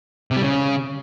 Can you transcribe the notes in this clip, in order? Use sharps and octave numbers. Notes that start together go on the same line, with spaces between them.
C3
G3
C#3